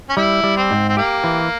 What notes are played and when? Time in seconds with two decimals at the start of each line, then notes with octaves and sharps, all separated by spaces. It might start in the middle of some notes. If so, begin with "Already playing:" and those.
0.09 C#4
0.17 G3 E4
0.44 G3
0.56 C4
0.71 G#2
0.89 C4
0.97 A#3 G4
1.24 E3